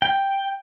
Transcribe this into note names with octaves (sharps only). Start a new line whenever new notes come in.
G5